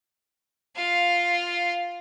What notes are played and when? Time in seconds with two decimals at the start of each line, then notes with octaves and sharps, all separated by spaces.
0.76 F4 F5